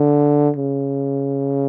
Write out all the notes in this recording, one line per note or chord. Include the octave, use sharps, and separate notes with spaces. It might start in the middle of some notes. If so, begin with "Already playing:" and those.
Already playing: D3
C#3